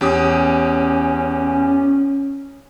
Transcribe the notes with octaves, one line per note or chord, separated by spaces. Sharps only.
E2 C#4 G4 D#6